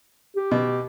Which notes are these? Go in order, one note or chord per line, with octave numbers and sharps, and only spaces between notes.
G4
B2